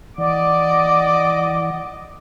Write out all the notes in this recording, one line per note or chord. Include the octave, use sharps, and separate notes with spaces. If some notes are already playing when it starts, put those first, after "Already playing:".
E3 D5 D#5 F#5 D6